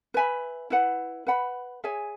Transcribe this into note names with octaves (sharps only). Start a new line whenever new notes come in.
B4 E5 G#5 B5
E4 B4 F#5
B4 F#5 B5
G#4 C#5 E5 G#5